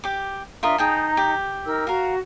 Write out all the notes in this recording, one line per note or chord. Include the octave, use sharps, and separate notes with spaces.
G4 D6
D4 F4 A#4 D#5 E5
D#4 G#4 G5 A5 A#5
G4
D#4 A#4 E6
F#4 A#4 F5